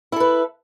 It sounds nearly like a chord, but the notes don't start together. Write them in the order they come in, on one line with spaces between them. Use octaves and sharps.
E4 A4 B4